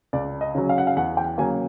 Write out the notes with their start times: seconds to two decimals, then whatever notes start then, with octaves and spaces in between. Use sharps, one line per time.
0.13 C#2 D5
0.41 D#5
0.55 C#3 F#3
0.69 F5
0.78 F#5
0.87 F5
0.96 E2 F#5
1.17 G5
1.38 C#3 F#3 A#3 G#5